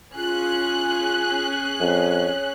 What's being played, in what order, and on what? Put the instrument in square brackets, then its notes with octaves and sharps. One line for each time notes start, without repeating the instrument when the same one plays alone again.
[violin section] C#4 G#4 F#6 [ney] F4
[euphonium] F2 [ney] C#5